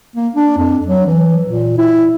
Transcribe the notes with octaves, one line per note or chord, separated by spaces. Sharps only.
A#3
D4
F2
F#3
E3
A#2
E4